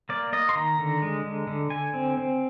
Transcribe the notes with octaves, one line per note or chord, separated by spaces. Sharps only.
A#3 D5
A#3 D#5
C6
D#3 A#5
D3
G#3
D3
D3
D3 G#5
C4
C4